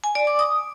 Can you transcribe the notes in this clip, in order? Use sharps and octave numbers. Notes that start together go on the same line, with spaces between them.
G#5
D5
D6
D#6